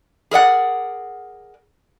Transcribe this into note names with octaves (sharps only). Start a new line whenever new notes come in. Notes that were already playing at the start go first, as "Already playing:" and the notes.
G#4 A#4 D5 F#5